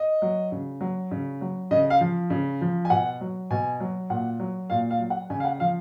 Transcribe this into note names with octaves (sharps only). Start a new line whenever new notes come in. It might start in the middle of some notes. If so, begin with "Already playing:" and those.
Already playing: D#5
F#3
C#3
F#3
C#3
F#3
C#3 D#5
F5
F3
C#3
F3
G#5
B2 F#5
F#3
B2 G#5
F#3
A#2 F#5
F#3
A#2 F5
F5
F#3
F#5
C#3 G#5
F5
F#5
F3 F5